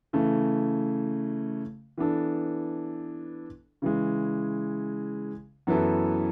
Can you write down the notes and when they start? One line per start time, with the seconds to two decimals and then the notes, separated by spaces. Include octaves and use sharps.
0.13 C#3 E3 A3
1.98 E3 B3 D4 A4
3.82 C#3 E3 G#3
5.67 F#2 E3 B3 E4 A4